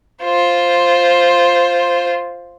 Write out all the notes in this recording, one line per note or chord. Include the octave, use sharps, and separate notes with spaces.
F4 C5